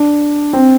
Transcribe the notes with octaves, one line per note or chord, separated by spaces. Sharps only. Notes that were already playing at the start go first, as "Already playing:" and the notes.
Already playing: D4
C4